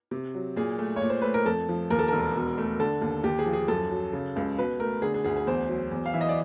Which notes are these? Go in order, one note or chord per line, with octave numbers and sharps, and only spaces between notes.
C3
F#3
A#2 G#4
A3
C#5
A#2
C5
A3 B4
A#4
F2 A4
F3
D#2 A#4
A4
E1 A#4
B2
A3
D3 A4
D#2
D#2 G4
G#4
F3
G#4
F#2 A4
F#3
C#3
C#2
B2 B4
A3 A#4
D3 G#4
G#4
D2 G#4
G#4
E2 C5
F#3
E2
F5
E3 E5
D#5
D5